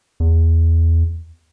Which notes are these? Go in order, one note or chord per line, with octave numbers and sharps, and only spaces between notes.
E2